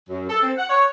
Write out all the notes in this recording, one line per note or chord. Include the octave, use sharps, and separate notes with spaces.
F#2
A4
C4
F#5
C#5